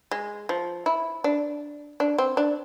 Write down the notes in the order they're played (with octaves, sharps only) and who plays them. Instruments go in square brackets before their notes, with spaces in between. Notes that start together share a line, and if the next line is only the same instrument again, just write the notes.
[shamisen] G#3
F3
E4
D4
D4
C4
D4